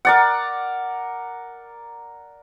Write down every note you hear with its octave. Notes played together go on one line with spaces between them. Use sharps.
A#4 D5 F#5